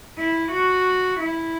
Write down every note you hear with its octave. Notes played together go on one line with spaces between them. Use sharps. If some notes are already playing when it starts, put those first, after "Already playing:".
E4
F#4
E4